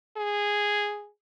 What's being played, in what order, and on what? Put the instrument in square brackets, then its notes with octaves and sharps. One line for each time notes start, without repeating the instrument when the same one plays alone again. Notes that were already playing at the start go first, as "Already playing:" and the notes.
[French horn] G#4